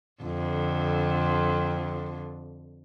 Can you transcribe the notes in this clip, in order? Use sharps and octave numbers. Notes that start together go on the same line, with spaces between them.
F2 D3